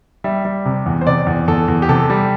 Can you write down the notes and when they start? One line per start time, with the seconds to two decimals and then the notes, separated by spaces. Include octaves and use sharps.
0.24 G3 E5
0.45 G3
0.65 C3
0.86 E2
1.01 C5
1.07 C3 D5
1.27 E2
1.48 E2 A4
1.68 E2
1.82 G4
1.89 C3 A4
2.10 G3